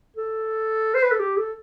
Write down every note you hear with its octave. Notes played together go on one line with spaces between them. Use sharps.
A4
C5
B4
A4
G4
A4